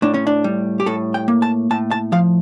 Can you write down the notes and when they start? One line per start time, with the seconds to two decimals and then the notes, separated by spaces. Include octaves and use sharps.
0.02 A2 D4
0.14 C#4
0.27 D4
0.44 G3
0.80 G4
0.86 A2 A4
1.14 G5
1.28 A#3
1.42 A5
1.71 A2 A5
1.91 A5
2.12 F3 F5